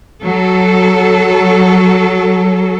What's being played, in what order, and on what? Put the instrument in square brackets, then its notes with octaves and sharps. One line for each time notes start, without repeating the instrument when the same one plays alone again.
[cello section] F#3 A4